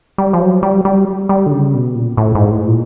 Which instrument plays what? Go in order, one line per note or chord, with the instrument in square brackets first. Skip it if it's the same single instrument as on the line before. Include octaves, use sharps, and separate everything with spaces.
[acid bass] G3
F3
F#3
G3
G3
G3
D3
C#3
B2
A#2
A2
G#2
A2
A#2